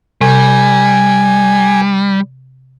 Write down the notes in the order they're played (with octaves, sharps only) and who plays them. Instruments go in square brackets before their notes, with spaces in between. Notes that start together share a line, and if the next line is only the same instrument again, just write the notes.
[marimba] C3 [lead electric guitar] G3 [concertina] G#5